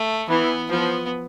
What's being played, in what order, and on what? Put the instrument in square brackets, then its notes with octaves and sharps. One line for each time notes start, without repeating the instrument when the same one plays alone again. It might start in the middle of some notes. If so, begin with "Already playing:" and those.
Already playing: [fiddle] A3
[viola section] E3 [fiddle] B3
[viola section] F3 [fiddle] B3